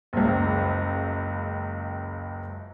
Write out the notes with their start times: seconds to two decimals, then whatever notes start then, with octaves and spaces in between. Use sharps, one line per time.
0.13 F#1 C#2